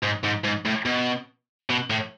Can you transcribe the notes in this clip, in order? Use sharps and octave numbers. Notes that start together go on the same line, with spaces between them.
G#2
G#2
G#2
A2
B2
B2
A2